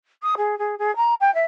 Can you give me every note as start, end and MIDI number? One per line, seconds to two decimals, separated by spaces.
0.22 0.34 87
0.37 0.58 68
0.58 0.75 68
0.78 0.94 68
0.96 1.14 82
1.20 1.33 79
1.34 1.45 76